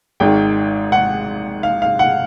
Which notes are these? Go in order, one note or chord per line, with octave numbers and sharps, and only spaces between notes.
G#1 G#2 D#3 G5
F#5
F5
F5
F#5